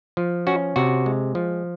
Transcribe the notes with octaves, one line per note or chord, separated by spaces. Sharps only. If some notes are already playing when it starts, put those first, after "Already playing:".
F3
C#4 F#4
C3 F#4
G#3
F3